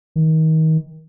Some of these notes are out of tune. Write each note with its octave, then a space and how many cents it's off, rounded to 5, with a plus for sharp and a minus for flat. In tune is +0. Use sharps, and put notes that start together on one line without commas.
D#3 +30